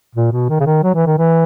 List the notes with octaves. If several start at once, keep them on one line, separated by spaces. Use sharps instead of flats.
A#2
B2
D#3
C#3
D#3
F#3
E3
D#3
E3